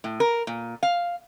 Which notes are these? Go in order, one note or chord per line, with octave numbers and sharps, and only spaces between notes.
A2
A#4
A#2
F5